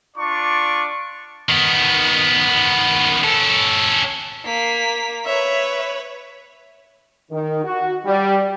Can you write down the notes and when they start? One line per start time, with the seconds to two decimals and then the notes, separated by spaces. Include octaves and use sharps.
0.17 D4 F4 D5 C#6
1.49 D#3 B3
3.24 C#4 A4
4.45 A#3 B6
5.25 B4 C#5 E5
7.32 D#3
7.65 F#4
8.05 G3